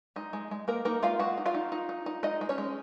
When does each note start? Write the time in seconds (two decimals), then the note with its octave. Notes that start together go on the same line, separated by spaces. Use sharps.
0.16 G#3 D#4
0.33 G#3
0.51 G#3
0.68 G#3 A#3 A#4
0.85 A#3 D#4 A#4
1.02 G#3 F4 F5
1.19 G#3 F#4 F#5
1.38 D#4
1.46 F4 F5
1.55 D#4
1.72 D#4
1.89 D#4
2.06 D#4
2.23 G#3 D#4 D#5
2.41 G#3
2.49 C#4 C#5
2.58 G#3